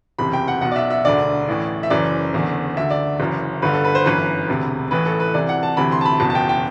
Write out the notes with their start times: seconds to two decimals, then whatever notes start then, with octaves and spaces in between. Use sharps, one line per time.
0.19 F#1 E2 C3 B5
0.33 G5
0.48 F#5
0.61 B1 B2 F#5
0.71 D5
0.76 E5
0.90 E5
1.05 E1 D2 D3 D5
1.48 A1 A2 E3
1.83 E5
1.90 F#1 F#2 E3 D5
2.34 F#1 E2 D3
2.76 D2 D3 E5
2.90 D5
3.20 F#1 F#2 E3
3.62 G1 G2 D3 B4
3.73 A4
3.85 B4
3.95 C5
4.05 G1 F#2 E3 B4
4.48 E1 D2 C3
4.91 A1 A2 E3 B4
5.06 A4
5.20 B4
5.34 C2 C3 E3 D5
5.49 F#5
5.63 A5
5.77 D2 C3 E3 B5
5.92 C6
6.01 A5
6.05 B5
6.20 F#1 E2 B2 A5
6.30 A5
6.35 G5
6.49 G5